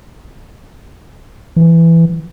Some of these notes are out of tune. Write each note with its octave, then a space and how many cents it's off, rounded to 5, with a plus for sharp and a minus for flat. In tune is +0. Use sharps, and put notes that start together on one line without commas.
E3 +10